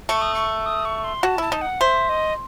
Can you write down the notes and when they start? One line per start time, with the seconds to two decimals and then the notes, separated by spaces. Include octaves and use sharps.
0.09 A3 C#6
0.22 D#6
0.35 C#6
0.66 D#6
0.85 C#6
1.04 C6
1.23 F#4 A5
1.38 E4 A5
1.52 D#4
1.61 F#5
1.81 C5 E5
2.09 D#5